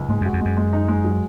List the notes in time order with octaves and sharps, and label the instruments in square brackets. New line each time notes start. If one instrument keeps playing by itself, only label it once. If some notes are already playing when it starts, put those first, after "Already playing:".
Already playing: [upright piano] C#2
[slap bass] G#2 [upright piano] G#3
[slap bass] F#2
[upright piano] F#4
[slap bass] F2
[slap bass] F#2 [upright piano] G#3
[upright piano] G#3
D#4
G#3
F#3